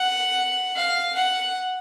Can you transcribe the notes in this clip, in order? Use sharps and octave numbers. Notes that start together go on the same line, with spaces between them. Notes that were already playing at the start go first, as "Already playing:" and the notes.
Already playing: F#5
F5
F#5